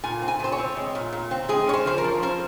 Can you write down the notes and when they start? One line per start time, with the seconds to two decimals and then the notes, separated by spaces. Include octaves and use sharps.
0.04 A#2 G#5
0.22 C4
0.28 G#5
0.40 A#2 C5
0.52 C#5
0.58 C4
0.77 G#3
0.95 A#2
1.13 A#2
1.31 C4
1.49 G#3 G#4
1.67 C#4 C#5
1.74 C5
1.86 F3 C5
1.98 A#4
2.04 F3
2.23 C#4 C5